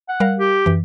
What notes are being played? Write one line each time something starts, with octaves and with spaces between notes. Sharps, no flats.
F#5
G3 A#4 F5
G4
F#2 E3